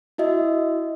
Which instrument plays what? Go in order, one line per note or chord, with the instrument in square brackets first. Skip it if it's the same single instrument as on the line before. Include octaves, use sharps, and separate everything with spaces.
[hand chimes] E4 F#4 D#5 E5